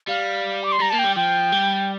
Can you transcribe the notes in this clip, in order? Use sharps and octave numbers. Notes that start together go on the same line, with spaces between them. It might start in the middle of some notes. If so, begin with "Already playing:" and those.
G3 F5
D6
C6
G3 A#5
A#3 A5
G5
G3
F3 G5
G3